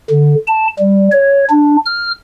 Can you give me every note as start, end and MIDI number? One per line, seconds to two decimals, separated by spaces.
0.11 0.35 50
0.47 0.67 81
0.79 1.08 55
1.12 1.45 73
1.49 1.76 62
1.86 2.11 89